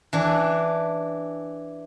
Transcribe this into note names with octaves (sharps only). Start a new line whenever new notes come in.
E3 D4